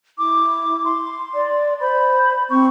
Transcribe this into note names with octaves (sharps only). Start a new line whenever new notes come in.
E4 D6
C6
D5
C5 B5
C4 C#6